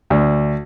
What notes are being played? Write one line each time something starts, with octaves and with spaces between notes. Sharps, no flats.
D2